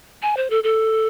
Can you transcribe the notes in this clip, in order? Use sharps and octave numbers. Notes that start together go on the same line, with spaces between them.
G#5
C5
A4
A4